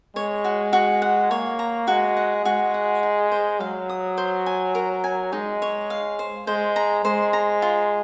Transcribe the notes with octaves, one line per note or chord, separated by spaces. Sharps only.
G#3 C#5
F#4
F#4
F#5
A#3 C#5
A#5
G#3 F#4
F#5
G#3 F#4
F#5
D#4
C5
F#3 F5
D#6
C5
G#5
A#4
G#5
G#3 D#4
C#5
F5
C5
G#3 C5
A#5
G#3 C5
A#5
F4